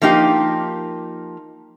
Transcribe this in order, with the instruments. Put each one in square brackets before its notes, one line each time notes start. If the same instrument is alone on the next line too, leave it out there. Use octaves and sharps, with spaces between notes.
[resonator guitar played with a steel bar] F3 A#3 D#4 G4